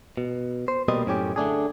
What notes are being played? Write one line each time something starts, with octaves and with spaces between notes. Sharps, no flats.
B2
C5
B2 G3 A#3 C4 B4 D#5
F#2 A2 C#4 G4
D3 A3 D4 G#4